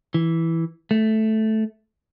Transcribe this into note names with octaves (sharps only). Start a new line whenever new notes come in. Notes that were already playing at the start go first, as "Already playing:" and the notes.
E3
A3